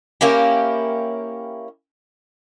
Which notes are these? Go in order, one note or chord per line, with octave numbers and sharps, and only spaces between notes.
A#3 C#4 E4 G4